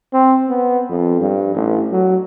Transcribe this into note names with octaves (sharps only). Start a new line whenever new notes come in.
C4
B3
F2
G2
A1
F#3